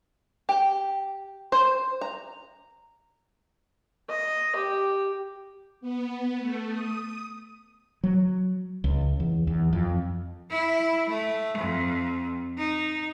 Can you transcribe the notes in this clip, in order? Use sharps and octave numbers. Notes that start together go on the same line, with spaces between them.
G4
C5
A#5
D#5
G4
B3
A3
D#6
F#3
C#2
E2
E2
F2
E4
A3
F2
D#4